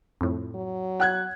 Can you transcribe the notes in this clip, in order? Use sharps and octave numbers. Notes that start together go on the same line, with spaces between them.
F2 A2
F#3
F#5 F#6 G#6